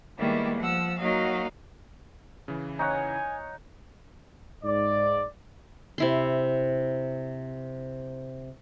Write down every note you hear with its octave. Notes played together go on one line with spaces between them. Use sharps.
D#3 G3 G#3 A#3 B3 E4
F3 F#5 E6
F#3 A#3 D#4 F#4 D#5 F5
C#3 E3
D#4 C#5 F#5 G#5
G#2 D5
C3 E4 C6